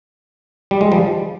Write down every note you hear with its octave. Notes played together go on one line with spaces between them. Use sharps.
G3
G#3
F3 G3